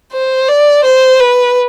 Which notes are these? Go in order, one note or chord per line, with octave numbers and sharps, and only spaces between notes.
C5
D5
C5
B4